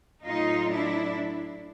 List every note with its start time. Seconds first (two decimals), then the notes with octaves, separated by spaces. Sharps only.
0.24 A2 F#3 D#4 F4
0.70 D4 E4